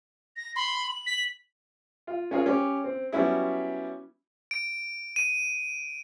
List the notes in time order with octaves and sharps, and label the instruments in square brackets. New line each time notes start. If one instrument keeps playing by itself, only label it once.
[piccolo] A#6
[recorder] B5 [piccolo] C6
[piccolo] F#7
[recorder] B6
[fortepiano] F4
C#4 F4 G#4 A#4
C#4 G4
C4
F#3 G3 B3 C#4 E4
[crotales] D7
D#7